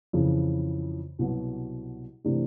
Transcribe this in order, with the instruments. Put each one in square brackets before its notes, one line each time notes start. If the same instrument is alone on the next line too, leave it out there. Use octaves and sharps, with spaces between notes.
[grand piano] F2 C#3 E3
C2 B2 F#3
C3 E3 A3 D4